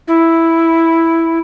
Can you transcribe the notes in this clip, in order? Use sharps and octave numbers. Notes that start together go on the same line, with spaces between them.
E4